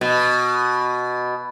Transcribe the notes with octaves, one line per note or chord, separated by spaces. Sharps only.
B2